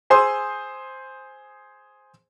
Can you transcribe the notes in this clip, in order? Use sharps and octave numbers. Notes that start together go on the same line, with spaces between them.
G#4 C5 C6 D#6 E6